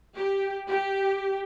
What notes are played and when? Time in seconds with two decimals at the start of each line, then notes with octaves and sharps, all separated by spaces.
0.14 G4
0.68 G4